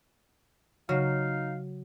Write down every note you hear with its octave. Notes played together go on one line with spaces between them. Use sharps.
C#3 F#3 D#4 F5